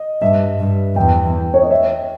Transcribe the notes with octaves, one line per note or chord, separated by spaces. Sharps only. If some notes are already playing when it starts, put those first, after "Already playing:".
Already playing: D#5
G2 E5
G2
E2 G5
C#5
D#5
E5